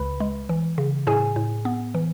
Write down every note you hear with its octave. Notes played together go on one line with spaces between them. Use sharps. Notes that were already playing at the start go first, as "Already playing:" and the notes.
Already playing: C#2 C#3 B4 B5
G#3
E3
C#3
A2 G#4 G#5
A2
B3
E3